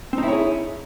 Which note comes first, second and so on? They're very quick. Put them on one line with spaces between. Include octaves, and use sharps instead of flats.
C4 D#4 E4 C#5 G#4